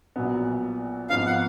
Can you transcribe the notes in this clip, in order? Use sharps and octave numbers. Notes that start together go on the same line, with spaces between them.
A#1 A#2 F#3 B3
G#1 G#2 F3 B3 F5
F#5